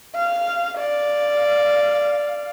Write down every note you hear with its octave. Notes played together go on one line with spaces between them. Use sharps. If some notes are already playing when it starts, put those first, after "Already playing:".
F5
D5 F5